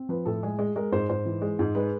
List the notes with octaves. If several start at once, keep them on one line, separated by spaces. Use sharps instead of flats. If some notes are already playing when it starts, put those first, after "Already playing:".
Already playing: C4
F3 B4
A2 A4
G#3 G#4
G#3
G#3 A#4
G#2 C5
G#2 C5
E3
G#3
G#2
G#3 B4